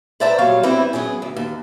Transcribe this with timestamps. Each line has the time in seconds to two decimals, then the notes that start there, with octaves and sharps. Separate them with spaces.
0.20 B4 C5 D5 E5 A5 A#5
0.38 A#2 F#3 G3 C#5 F5
0.63 E3 G3 B3 C4 E4
0.93 F#3 B3 C#4 G#4
1.22 D2
1.37 D#2